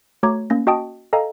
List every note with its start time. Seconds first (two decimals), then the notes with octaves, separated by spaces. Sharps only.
0.23 A3 F#4 C#5 A#5 D6 G#6
0.50 A#3 C#4 A#6
0.67 F#4 D#5 G5 A5 D#6 D7
1.13 A4 D#5 F5 G#5 A#5